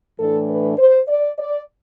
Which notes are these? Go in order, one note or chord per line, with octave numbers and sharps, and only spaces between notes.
A2 E3 A3 D4 A4
B4
C5
D5
D5